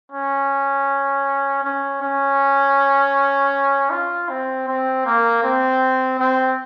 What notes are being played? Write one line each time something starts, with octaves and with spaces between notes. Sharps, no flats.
C#4
C#4
C#4
F4
C4
C4
A#3
C4
C4